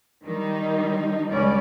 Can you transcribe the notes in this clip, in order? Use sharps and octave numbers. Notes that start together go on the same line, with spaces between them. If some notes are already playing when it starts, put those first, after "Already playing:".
D#3 G3 D#4
C#2 G3 C#4 D5